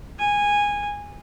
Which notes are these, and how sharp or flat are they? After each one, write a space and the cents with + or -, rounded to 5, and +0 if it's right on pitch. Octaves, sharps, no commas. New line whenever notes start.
G#5 -15